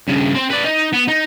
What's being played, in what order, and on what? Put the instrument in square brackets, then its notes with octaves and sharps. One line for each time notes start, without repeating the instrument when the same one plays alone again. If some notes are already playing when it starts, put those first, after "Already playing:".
[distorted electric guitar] G2 C#3
C4
B4 D5
D#4
B3
D#4